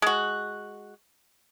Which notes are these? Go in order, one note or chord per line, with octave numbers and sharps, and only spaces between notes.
G#3 F#4